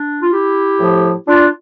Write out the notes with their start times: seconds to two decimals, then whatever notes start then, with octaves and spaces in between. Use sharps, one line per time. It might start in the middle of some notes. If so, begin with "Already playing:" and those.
Already playing: D4
0.21 F4
0.31 E4 G4
0.80 A2 F3
1.27 D4 F4